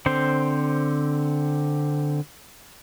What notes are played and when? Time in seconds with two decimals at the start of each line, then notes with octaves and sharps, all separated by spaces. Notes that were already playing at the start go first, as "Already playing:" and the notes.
0.06 D3 C4 C5